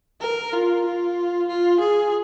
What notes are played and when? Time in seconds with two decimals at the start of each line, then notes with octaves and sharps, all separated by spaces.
0.21 A#4
0.53 F4
0.85 F4
1.48 F4
1.80 G#4